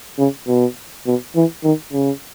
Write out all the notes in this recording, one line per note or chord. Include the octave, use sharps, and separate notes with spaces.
C#3
B2
B2
E3
D#3
C#3